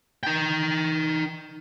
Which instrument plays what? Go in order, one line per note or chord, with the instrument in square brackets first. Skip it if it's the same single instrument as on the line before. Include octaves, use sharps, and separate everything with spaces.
[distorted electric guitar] D#4 G5